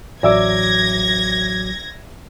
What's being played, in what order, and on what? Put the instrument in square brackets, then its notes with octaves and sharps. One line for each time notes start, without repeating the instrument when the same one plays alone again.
[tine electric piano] A1 F#3 D6 [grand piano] D5 E5 E6 [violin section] G#6 A#6